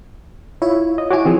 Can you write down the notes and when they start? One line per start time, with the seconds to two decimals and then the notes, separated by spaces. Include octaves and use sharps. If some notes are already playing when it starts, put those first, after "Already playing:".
0.62 E4 F4 C#5
0.98 D#5
1.11 E4 F#4 C#5 G#5 D6
1.25 E3 F3 C4 G#4